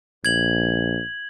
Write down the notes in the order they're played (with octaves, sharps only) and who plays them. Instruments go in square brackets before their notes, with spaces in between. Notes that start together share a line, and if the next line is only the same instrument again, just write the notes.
[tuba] A#1 [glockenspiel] G#6 F#7